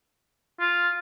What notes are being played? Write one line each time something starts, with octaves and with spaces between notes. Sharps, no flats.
F4